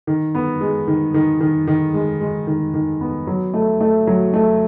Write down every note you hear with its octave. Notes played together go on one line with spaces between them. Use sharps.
D#3
B3
G#3
D#3
D#3
D#3
D#3
G#3
G#3
D#3
D#3
B3
F#3
A3
A3
F#3
A3